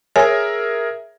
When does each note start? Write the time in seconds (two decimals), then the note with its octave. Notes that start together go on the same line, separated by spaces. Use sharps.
0.16 G#4 A#4 C#5 E5 G#5